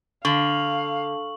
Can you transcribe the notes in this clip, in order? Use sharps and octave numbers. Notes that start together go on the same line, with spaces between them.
D3 F5 C#6 F#7